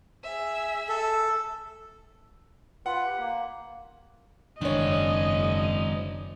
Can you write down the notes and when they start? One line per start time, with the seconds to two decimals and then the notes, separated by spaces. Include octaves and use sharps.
0.23 G#4 E5
0.89 A4
2.86 F4 B4 F#5
3.06 G4
3.18 A#3
4.61 F#1 D#3 G#3 D4 C#5 D#5